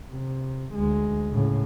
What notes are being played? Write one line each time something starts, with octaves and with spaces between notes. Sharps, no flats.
C3
D2 G#3
A2 C#3